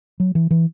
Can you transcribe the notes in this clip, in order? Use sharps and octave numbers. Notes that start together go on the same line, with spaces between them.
F#3
E3
E3